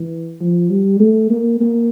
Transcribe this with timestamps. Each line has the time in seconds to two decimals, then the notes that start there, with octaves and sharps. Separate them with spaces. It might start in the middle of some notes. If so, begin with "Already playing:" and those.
Already playing: E3
0.41 F3
0.70 G3
1.00 A3
1.30 A#3
1.61 A#3